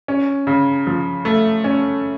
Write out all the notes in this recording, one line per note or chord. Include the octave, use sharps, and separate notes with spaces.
C#4
C#3
F3
A3
C#4